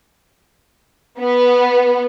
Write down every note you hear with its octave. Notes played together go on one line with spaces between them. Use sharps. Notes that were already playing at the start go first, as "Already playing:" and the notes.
B3